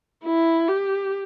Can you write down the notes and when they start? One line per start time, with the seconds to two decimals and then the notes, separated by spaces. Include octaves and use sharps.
0.24 E4
0.68 G4